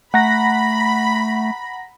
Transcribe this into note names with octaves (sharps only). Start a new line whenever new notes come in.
A3 F#5 A#5 B5 A#6